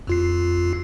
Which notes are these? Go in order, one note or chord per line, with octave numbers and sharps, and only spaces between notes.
F2 F4 C7